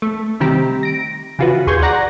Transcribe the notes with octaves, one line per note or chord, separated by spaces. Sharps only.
A3
C3 D#3 G3 C4 G4 A#5
A#6 D7
C#3 E3 F4 F#4 B4
D#2 G#4 C6 C#6 G6 G#6
D5 F#5 A#5 A#6